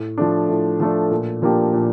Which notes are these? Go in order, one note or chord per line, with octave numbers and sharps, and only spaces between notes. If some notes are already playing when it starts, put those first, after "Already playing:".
Already playing: A2
F3 A3 D4
A2
F3 A3 D4
A#2
F3 A#3 D4 G4
A#2